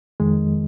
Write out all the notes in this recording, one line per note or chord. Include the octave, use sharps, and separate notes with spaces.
F2 D#3 G#3